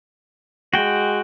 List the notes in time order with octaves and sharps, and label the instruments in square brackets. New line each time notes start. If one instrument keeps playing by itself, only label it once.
[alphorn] G#3 [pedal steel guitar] F#4 G5